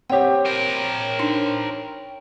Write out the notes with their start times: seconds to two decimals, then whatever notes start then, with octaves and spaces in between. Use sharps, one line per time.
0.10 C4 G4 C#5 F#5 G5
0.45 A#4 C5
1.19 D4 D#4 C6